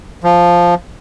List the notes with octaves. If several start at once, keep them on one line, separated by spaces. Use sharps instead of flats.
F3